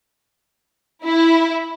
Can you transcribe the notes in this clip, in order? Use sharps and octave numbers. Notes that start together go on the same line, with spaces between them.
E4